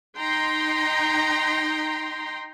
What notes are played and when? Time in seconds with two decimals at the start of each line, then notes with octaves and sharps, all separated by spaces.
0.19 D#4 G5 A#5 C6